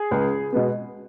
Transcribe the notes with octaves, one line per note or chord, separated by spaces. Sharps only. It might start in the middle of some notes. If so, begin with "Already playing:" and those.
Already playing: G#4
C#2
B2 G#3 B3